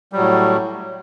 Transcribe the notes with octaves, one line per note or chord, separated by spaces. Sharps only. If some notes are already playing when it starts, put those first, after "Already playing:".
A2 F#3 G3